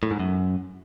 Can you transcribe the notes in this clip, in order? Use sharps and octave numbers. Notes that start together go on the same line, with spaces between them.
A2
G#2
F#2